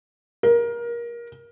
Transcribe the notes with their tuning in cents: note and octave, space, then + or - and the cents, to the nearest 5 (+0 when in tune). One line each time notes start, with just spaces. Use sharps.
A#4 +20